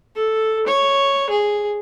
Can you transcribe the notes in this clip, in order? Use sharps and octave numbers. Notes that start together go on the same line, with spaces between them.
A4
C#5
G#4